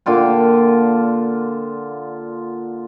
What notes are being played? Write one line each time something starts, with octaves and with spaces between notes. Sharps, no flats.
A#2 D3 F4 G5